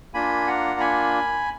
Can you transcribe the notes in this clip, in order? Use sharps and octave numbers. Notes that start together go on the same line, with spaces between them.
A#3 D4 F4 G#5 B5
F#5 A#5
G#5 B5